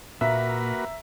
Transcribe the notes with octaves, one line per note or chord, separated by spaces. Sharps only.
A#2 A#3 F#4 B4 E5 A#5